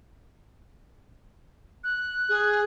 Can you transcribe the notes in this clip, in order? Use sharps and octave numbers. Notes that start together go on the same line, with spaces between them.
F#6
G#4